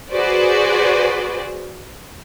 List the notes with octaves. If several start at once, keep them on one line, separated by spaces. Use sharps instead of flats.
F#4 G#4 B4 C5 D5